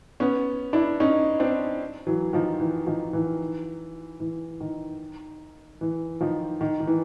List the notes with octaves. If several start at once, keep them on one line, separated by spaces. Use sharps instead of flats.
B3 C#4
D4 E4
C#4 D#4
C4 D4
E3 F#3
D#3 F3
E3
D#3 F3
E3
E3
D#3
E3
D#3 F3
D#3
D#3
E3